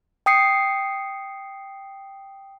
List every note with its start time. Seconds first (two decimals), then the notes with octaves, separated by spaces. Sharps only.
0.26 G5 D#6 C7 C#7